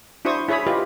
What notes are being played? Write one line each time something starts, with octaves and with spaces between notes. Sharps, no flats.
D4 E4 F#4 C5 C#6 D#6
E4 G#4 C#5 B5 D#6
F4 G4 B4 D#5